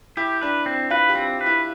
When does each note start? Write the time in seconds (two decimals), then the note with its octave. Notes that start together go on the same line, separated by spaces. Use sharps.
0.17 E4 G4
0.41 D4 B4
0.66 C4
0.91 F4 B4
1.09 G4
1.15 C4
1.41 B4
1.46 E4